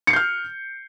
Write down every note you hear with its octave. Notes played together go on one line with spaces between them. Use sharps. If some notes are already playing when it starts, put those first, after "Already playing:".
F6 G6 C7 C#7